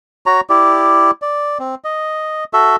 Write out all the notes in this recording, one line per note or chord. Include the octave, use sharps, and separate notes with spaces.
F#4 C#5 A#5
E4 G4 D5
D5
C4
D#5
F#4 A4 E5